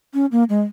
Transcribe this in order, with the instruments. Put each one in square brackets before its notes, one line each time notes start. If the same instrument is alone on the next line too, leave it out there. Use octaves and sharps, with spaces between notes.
[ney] C#4
A#3
G#3